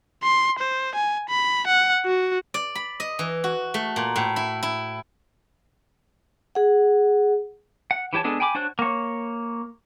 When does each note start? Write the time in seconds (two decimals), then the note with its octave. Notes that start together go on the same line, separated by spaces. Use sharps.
0.23 C6
0.59 C5
0.95 G#5
1.29 B5
1.67 F#5
2.06 F#4
2.54 D5
2.75 B5
3.00 D#5
3.19 E3
3.44 F#4
3.74 A3
3.96 A#2
4.16 A2
4.36 E4
4.63 E4
6.55 G#4 F#5
7.91 F#5
8.13 E3 E4 G4 C#5 A5
8.24 G#3 B3 D4 G#4 A4
8.40 G5 G#5 B5 C#6 D6
8.55 D4 F#4 C5 C#5 F#6
8.79 A#3 C#5